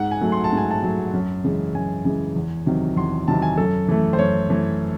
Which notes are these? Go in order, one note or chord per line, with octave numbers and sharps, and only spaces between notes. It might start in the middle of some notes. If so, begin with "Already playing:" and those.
Already playing: G#2 F#5
G#5
F#3 A3
C6
A5
G#2
G#5
A5
F#3 A3
F#2
C#3 E3 G#3
F#2 G#5
C#3 E3 G#3
E2
C3 D#3 F#3
E2 C6
C3 D#3 F#3 A5
G#5
F#2 A4
E3 A3
C5
F#2 C#5
E3 A3